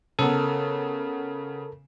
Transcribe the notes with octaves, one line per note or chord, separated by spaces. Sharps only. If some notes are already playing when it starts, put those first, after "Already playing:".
C#3 B3 A4 A#4